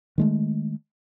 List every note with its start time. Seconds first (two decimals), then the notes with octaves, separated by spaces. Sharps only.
0.18 D#3 G#3 A3